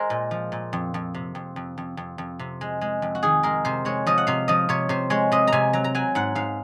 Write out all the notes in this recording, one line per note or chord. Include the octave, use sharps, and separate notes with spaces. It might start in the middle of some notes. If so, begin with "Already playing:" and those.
Already playing: G#3 A#4 C5
A#2
F3
A#2
F2
F2
C3
F2
F2
F2
F2
F2
C3
G#3
G#3
F2
F#4
D#3 G#4
G#3 A#4
C3 C5
G#3 C#5
F3 D#5
F#5
C3 F5
F3 D#5
C3 C#5
C3 C5
G#3 C#5
C3 D#5
A#5
C3 G#5
F#3 A#5
A#5
F#3 G#5
G#2 F#5
G#2 F5